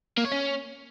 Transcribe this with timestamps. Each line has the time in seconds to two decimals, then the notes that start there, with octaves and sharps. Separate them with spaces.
0.17 A#3
0.25 C#5
0.32 C#4